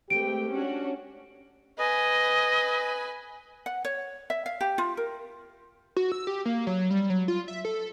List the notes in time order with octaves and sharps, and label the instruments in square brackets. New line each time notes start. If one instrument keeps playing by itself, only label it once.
[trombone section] G#3 C4 G4 [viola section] A3 B4 G5 [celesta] D7
[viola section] C#4 D4 F#4
[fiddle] B4 G#5 [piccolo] D#5
[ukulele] F#5
C#5
E5
F5
G4
F4
A#4
[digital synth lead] F#4
E6
G4
A#3
F#3
G3
F#3
F4
E5
A4